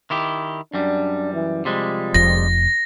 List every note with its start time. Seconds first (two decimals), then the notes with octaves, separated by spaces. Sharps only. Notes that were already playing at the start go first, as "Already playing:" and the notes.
0.10 D#3 E4 G4
0.74 F#2 G3 D4
1.33 E3
1.65 C3 F3 G3 G#3
2.14 F1 F2 A#6